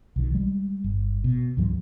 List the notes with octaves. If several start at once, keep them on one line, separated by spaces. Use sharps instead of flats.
B1 D#3
G3 G#3
G1
B2
C#2 G#2 E3 F#3